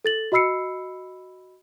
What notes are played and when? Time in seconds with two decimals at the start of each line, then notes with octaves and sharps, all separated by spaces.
0.05 A4 A6 F#7
0.32 F#4 D#5 B5 E6 C7 C#7